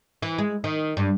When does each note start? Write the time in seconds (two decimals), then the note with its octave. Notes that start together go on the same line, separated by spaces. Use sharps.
0.22 E3
0.38 G#3
0.64 D#3
0.97 G2